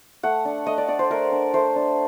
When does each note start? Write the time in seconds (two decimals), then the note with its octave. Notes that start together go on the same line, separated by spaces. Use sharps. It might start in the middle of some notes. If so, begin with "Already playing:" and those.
0.23 A3 F#5
0.45 D4
0.66 A3 D#5
0.78 D5
0.88 D4 D5
0.99 C5
1.10 A3 A#4
1.32 D4
1.54 A3 C5
1.76 D4